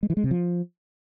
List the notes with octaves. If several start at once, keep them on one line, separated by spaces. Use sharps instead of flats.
G#3
E3
G#3
C3
F3